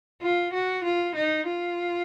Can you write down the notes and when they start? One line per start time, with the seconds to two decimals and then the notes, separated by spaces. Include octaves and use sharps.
0.22 F4
0.53 F#4
0.84 F4
1.15 D#4
1.46 F4